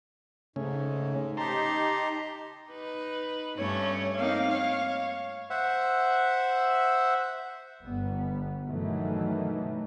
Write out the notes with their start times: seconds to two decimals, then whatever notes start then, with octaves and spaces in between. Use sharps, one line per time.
0.56 G#2 C#3 A3 C#4
1.37 D#4 G4 A5 A#5 C6
2.69 D#4 B4
3.57 G2 A3 C#4 C#5
4.18 A#3 C4 D#4 F5
4.50 C#5
5.50 C5 E5 F#5
7.83 G1 G3 B3
8.66 G2 B2 D#3 E3 F#3 A3